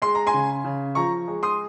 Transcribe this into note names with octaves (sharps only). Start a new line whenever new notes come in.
G#3 C6
A#5
G#5 C6
C#3
C#3
F3 A#5 C#6
G#3
C6 D#6